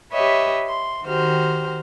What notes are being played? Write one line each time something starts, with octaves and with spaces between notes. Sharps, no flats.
G4 B4 C#5 D#5 E5
C6
D#3 F#4 G4 C5 F6